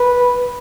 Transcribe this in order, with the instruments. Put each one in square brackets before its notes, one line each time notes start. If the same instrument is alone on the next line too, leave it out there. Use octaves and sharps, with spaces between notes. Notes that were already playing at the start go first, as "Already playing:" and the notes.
Already playing: [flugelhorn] B4